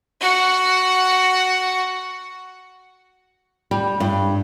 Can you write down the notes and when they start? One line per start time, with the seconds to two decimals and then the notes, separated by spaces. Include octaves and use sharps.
0.20 F#4 F#5
3.71 G3
4.00 G2